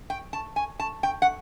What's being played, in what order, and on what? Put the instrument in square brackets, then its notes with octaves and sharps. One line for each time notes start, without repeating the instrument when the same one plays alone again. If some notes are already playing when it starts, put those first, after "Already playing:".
[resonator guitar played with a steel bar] G5
A5
G#5
A5
G5
F#5